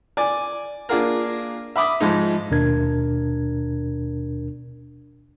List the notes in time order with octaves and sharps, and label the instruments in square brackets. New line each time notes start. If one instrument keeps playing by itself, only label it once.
[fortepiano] D5 G#5 D6
A#3 D4 F4 G#4 A#4
E5 B5 D6 D#6
G#2 F3 G#3 D#4
[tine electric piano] D#2 B2 D4 A#4 G#6